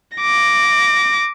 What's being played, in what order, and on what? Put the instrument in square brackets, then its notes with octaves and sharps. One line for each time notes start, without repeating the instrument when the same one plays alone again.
[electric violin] D6 A#6